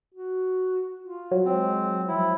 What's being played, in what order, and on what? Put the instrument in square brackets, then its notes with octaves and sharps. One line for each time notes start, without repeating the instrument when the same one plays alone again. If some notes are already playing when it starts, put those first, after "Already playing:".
[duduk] F#4
F4
[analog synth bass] F#3
[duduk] G#3 [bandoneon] C4
[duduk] F3 [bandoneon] E4